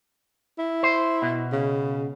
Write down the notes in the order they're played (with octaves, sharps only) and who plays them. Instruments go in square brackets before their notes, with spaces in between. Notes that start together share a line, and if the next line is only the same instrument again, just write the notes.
[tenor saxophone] E4
[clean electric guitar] C5
B2
[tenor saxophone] C#3